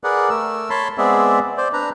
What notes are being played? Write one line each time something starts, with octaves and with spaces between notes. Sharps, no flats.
G#4 A#4 B4 D5 F#5
A3 A#4 E6
C#5 A5 B5 C6
G#3 B3 C4 G#4 D5 E5
C5 D5
D4 B4 A#5